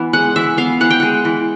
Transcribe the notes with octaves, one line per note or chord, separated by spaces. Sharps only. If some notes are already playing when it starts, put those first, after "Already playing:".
Already playing: E3 B3
G#3 F#5
E3 E5
B3 F5
E3 F#5
G5
G#3 F#5
E3